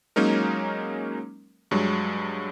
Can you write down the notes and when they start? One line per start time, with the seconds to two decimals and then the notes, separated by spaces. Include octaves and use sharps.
0.16 F#3 G#3 A#3 C#4 D#4 A#4
1.71 G2 F#3 G#3